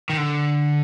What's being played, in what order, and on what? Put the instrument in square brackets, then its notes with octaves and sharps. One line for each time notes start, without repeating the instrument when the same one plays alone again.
[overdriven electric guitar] D#3
D3